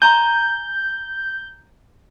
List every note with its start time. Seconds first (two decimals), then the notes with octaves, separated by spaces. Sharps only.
0.02 G#5 A#5 G6